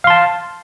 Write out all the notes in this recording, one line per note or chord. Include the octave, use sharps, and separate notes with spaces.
F5 A5 C6